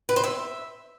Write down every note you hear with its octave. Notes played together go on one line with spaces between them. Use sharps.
B4
C5
E5